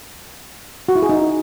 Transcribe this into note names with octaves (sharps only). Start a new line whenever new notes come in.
F#4
E4
G#4
D#4